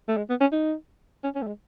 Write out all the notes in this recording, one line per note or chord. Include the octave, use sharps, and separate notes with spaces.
A3
G#3
B3
C#4
D#4
C#4
C#4
A3
G#3